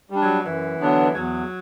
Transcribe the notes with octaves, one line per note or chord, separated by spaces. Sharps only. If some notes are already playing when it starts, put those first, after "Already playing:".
G3 D4
F#3
F#2 E3
D3 F#3 B3 D4
E2 F#3